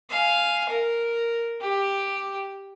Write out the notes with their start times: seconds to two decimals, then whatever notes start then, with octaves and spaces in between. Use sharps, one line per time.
0.10 F5 G#5
0.69 A#4
1.61 G4